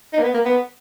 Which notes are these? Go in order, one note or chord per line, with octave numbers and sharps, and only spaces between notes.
D#4
A#3
B3
A#3
B3